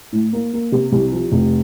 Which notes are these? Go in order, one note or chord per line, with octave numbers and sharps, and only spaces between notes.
A2
A#3
A#3
C3
C2
F3
F1